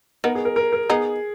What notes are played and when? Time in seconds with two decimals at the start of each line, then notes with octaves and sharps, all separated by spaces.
0.24 B3 D#4 A#4
0.35 G#4
0.45 A#4
0.56 A#4
0.73 A#4
0.89 B3 D#4 G#4